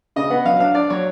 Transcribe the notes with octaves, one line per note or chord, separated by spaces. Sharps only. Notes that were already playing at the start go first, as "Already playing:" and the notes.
C#3 D#5
B3 F#5
F#3 F5
D4 F5
D4 D5
F#3 C#5